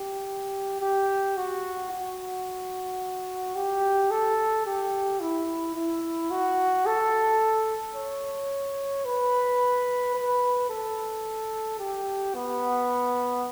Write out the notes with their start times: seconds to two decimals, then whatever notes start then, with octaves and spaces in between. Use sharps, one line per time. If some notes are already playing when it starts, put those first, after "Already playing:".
Already playing: G4
0.81 G4
1.37 F#4
1.91 F#4
3.55 G4
4.11 A4
4.66 G4
5.20 E4
5.75 E4
6.31 F#4
6.86 A4
7.95 C#5
9.05 B4
10.15 B4
10.69 A4
11.79 G4
12.35 B3